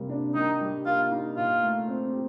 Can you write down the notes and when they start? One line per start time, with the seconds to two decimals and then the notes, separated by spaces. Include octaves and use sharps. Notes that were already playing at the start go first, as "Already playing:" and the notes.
Already playing: C3 G3 A#3
0.09 D4
0.35 D#3 D#4
0.60 G3
0.85 A#3 F4
1.11 D#4
1.36 A#2 F4
1.63 A3
1.88 C4
2.12 G4